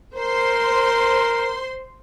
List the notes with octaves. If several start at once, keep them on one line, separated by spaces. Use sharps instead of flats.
A#4 C5 C6